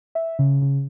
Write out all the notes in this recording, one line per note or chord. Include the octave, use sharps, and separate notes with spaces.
E5
C#3
C#3